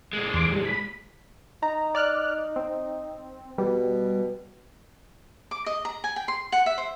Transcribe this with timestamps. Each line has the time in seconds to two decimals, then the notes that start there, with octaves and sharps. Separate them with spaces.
0.13 A#2 G#3
0.34 E2 C6 D6
0.52 G3
0.65 B5
1.63 D#4 A#5
1.95 D5 F6 F#6
2.56 C4
3.58 B2 G3
5.51 D6
5.66 D#5
5.85 A#5
6.04 G#5
6.16 G5
6.28 C6
6.52 F#5
6.66 E5
6.78 C5